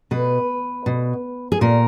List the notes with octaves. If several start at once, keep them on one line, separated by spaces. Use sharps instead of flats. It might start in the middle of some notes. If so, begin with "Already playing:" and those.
B2 B4
B2
G#4
A#2 A#4